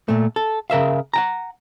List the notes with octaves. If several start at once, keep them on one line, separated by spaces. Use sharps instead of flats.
A#2 A3
A4
C#3 A#4 E5 F5
F#5 G5 A#5